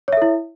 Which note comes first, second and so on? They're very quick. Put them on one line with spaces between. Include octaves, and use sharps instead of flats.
C#5 E5 A4 E4